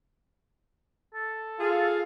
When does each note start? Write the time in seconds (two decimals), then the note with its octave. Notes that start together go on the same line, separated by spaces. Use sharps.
1.14 A4
1.60 F4 G#4 F5